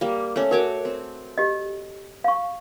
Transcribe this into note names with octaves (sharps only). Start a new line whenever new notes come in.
G3 A#3
A3 C#4
F#4 A#4 C#5 D6
C4
G4 D#5
F5 C#6